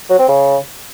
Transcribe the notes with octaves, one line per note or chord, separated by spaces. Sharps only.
F#3
C4
C#3